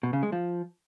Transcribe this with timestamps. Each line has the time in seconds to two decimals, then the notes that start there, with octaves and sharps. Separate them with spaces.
0.03 B2
0.13 C#3
0.23 G#3
0.32 F3